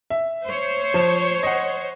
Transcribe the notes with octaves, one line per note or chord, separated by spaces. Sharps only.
E5
C5 C#5
F3 E7
D#5 F#5